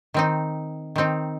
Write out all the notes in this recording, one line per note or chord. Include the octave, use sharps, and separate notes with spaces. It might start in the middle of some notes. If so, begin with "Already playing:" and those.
D#3 C4 D#4
D#3 C4 D#4